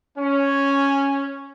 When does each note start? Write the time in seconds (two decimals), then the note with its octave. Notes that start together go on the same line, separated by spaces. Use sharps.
0.18 C#4